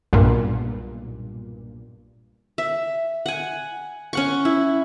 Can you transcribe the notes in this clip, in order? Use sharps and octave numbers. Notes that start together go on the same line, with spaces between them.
B1 G2 A#2
E5
F#5 G#5
C#4 F#5 C#6
E4